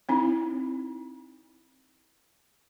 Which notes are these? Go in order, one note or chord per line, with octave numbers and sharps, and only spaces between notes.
C4 D#4 E4